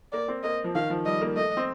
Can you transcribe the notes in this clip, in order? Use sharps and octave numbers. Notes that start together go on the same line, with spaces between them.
A#3 D5
C4
A#3 D#5
F3
D#3 F5
F3
G3 D#5
A#3
A3 D#5
C4